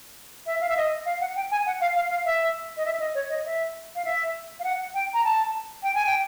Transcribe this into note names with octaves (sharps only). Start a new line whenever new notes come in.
E5
F5
E5
D#5
F5
F#5
G5
G#5
F#5
F5
F5
F5
E5
D#5
E5
D#5
C#5
D#5
E5
F5
E5
F5
F#5
G5
A#5
A5
G5
G#5
G5